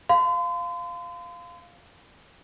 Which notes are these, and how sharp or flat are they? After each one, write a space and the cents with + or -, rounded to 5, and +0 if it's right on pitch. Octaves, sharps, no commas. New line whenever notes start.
F5 +0 C6 -40